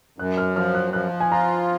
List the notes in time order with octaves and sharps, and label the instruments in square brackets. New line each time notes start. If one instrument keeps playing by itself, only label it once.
[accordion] F#2 [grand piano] F#6
[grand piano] F6
[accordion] F3 [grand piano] F6
[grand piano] F#6
[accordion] F3 [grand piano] F#6
[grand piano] G#5
[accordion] F4 [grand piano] A#5